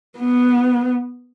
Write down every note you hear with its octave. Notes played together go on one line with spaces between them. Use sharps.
B3